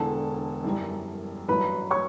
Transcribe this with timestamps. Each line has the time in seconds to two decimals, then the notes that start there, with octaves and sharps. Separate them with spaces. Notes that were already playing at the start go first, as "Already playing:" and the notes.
Already playing: E1 E2 D3 A4 A5
0.64 F#2 E3 G3
1.48 A1 G2 F#3 B4 B5
1.91 C#5 C#6